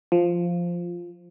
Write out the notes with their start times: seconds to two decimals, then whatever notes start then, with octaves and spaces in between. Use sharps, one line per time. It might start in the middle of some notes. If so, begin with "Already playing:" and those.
0.12 F3